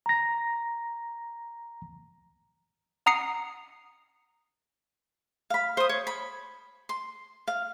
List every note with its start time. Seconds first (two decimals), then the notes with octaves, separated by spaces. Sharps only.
0.06 A#5 A#6
3.06 F#5 A#5 D#6 C7 C#7
5.50 F5 B5
5.77 C5 D#6
5.89 C#5
6.07 B5
6.89 C6
7.48 F5